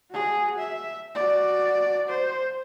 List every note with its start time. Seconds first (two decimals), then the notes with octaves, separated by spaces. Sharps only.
0.11 F#4 G#4
0.59 E5
1.15 F#4 D5
2.09 C5